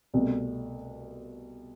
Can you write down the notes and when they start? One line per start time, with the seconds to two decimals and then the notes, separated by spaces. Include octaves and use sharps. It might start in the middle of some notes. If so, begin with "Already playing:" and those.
0.14 C2 B2 A3